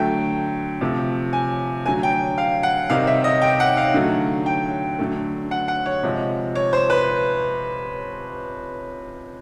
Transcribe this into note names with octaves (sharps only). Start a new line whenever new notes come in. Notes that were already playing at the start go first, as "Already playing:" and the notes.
Already playing: D3 F#3 A3 G5
C3 F3 A3
G#5
D3 F#3 A3 G#5
G5
F5
F#5
C3 D#3 G3 F5
E5
D#5
G5
F#5
F5
D3 F#3 A3
G5
D3 F#3 A3
F#5
F#5
C#5
C3 F3 G#3
C#5
C5
B4